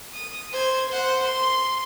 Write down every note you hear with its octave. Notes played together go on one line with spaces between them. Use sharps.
D#6
C5 G#6
C5 F#5
C6